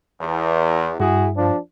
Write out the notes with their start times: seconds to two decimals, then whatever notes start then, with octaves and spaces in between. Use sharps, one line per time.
0.20 E2
1.00 G2 E4 F#4 G#4
1.36 F3 D4